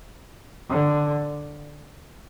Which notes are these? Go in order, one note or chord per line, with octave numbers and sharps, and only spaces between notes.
D3